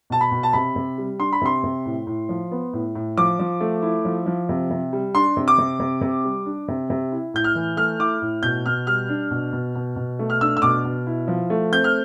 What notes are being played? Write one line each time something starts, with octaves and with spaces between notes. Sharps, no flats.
B2 A5
B5
B2
A5
C3 B5
C3
G3
D4 C6
B5
C3 C6
C3
A2
A2
F3
B3
A2
A2
F3 D6
F3
A3
E4
F3
F3
C3
C3
G3
D4 C6
C3
D6
C3
C3
C3
G3
D4
C3
C3
E4
A2 G6
F6
E3
A3 F6
E4 D6
A2
B2 G6
B2 F6
G3 F6
D4
B2
B2
B2
B2
A3
F6
D4 E6
E6
B2 D6
B2
E4
F3
A3
C4 G6
F6